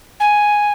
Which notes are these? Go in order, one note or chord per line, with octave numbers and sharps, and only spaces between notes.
G#5